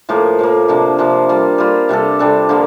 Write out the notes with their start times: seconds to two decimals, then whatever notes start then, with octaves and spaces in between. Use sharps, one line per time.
0.09 A2 F3 A#3
0.39 A2 F3 A#3
0.68 C3 F3 A#3 D4
0.99 C3 F3 A#3 D4
1.29 G3 A#3 F4
1.58 G3 A#3 F4
1.89 C3 G3 D4 A4
2.19 C3 G3 D4 A4
2.49 D3 F3 A#3